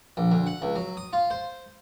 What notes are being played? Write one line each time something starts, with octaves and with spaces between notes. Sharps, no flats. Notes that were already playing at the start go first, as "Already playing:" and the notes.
A#1
D2
F#5
C#2
F#3
D#6
F4
C5